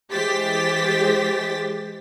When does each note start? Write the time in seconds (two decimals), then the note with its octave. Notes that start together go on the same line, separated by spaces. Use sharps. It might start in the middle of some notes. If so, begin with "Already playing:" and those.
0.12 E3 G#3 G4 C5 A6 B6